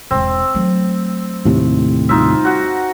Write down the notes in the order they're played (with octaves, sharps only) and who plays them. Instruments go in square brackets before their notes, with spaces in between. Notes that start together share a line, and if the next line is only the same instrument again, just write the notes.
[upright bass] E1 G#2 [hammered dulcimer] C4
[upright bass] F#3 A3
[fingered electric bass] D#2 A2 C3
[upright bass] G3 [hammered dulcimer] D#4 F4 E5
[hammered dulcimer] F#4 F#5